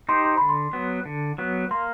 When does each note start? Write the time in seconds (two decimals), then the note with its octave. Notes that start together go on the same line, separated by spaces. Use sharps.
0.09 D#4 G4 C5 C6
0.25 C6
0.37 D3 B5
0.49 C6
0.73 F#3 B3
1.05 D3
1.38 F#3 B3
1.71 A#3 C6